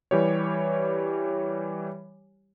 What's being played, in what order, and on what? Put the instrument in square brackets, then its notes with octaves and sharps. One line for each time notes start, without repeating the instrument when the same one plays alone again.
[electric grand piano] E3 G3 G4 C#5